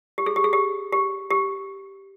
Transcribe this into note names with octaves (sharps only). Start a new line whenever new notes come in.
G4
G#4
G4
G#4
G4
G4
G4